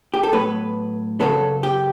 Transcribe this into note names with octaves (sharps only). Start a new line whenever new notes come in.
G4
A4
A2 F#3 B3 B4
F#2 C#3 F#3 B3 A4
G4